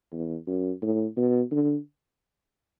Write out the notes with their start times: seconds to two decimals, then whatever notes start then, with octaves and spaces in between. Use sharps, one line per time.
0.12 E2
0.47 F#2
0.82 A2
1.17 B2
1.52 D3